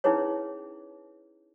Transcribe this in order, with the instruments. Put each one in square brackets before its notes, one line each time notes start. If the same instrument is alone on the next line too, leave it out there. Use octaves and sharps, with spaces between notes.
[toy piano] C#4 D#4 E4 G#4 B4 C#5